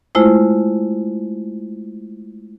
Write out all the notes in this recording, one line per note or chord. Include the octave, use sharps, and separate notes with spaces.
G#3 A3 E4 F4 C5